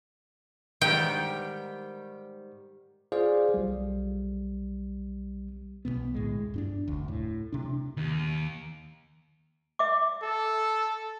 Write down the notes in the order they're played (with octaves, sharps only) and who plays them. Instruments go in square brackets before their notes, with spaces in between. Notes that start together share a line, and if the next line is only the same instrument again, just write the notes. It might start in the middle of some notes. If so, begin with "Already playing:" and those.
[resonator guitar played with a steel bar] G#2 D#3 G3 [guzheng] G5
[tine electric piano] F4 G#4 C5 D5 F5
B1 G3
[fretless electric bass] B1 F#2 B2 B3
D2 A2 G#3
G2 C#4 D4
F1 D2
A2
C3 D4
[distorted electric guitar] D#2
[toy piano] E5 D6
[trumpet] A4